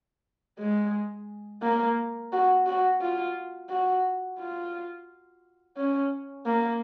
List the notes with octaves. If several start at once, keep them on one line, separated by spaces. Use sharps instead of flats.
G#3
A#3
F#4
F#4
F4
F#4
F4
C#4
A#3